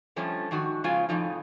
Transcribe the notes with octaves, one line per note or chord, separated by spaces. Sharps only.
D3 F3 G3 A3 C#4
G#2 D#3 F#4
C#3 F3 G#3 F4 F5 G#5
F2 A2 F3 D#4